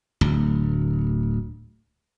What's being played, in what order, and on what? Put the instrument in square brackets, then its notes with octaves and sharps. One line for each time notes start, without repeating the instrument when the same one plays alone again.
[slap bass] D1 D2